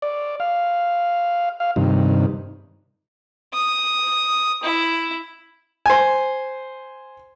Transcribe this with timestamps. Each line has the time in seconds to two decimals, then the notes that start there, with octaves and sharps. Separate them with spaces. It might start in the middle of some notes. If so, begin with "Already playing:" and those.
0.02 D5
0.40 F5
1.60 F5
1.76 G2 C3 D#3
3.54 D#6
4.63 E4
5.86 C5 G#5